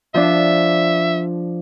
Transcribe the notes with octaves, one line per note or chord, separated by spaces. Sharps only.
F3 D4 E5